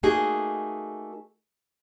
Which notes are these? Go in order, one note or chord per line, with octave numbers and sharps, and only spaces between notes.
A3 A#3 D#4 F#4 G#4